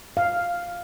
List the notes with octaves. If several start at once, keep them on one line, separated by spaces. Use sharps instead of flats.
F5